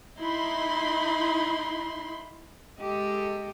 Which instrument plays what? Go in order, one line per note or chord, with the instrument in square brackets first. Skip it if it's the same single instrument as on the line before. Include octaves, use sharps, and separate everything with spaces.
[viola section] D#4 E4 B5 C6
[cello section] G#3 G4 A4 D#5